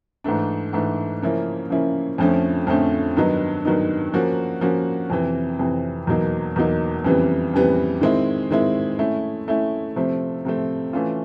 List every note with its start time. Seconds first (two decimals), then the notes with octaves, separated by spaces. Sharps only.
0.24 G#2 E3 A3 D4
0.73 G#2 E3 A3 D4
1.22 C#3 F3 A#3 C#4 E4
1.70 C#3 F3 A#3 C#4 E4
2.18 F2 D3 F3 A3 C#4
2.67 F2 D3 F3 A3 C#4
3.17 G2 D#3 F#3 B3 D#4
3.65 G2 D#3 F#3 B3 D#4
4.13 F3 A#3 C#4 F#4
4.61 F3 A#3 C#4 F#4
5.10 F2 C3 E3
5.59 F2 C3 E3
6.07 E2 B2 F#3 A#3 D#4
6.56 E2 B2 F#3 A#3 D#4
7.05 F2 C#3 E3 G3 B3
7.54 F2 C#3 E3 G3 B3
8.01 D#3 G#3 C4 E4
8.51 D#3 G#3 C4 E4
8.99 A3 C#4 E4
9.48 A3 C#4 E4
9.96 C3 F3 A3 C4
10.45 C3 F3 A3 C4
10.93 E3 A3 C#4 F4